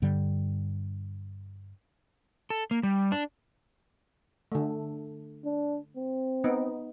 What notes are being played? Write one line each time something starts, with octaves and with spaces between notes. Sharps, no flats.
G2 D3 G3
A4
A#3
G3
D4
D3 A3
D4
C4
B3 D#4